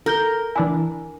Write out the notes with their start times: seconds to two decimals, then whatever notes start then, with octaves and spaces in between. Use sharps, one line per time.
0.06 A4 A#4 G6 G7
0.56 E3 D4 E4 G#5